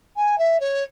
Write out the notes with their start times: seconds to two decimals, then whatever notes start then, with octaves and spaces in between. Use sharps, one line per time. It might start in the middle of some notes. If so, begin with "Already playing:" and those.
0.17 G#5
0.38 E5
0.60 C#5